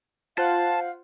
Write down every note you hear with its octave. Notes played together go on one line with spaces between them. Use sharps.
F4 C5 F5 F#5 A5